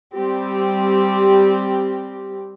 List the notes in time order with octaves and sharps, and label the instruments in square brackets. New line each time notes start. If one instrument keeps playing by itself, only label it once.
[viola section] G3 C4 G4